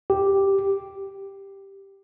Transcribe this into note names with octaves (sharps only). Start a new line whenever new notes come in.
G4